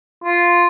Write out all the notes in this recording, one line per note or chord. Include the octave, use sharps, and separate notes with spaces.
F4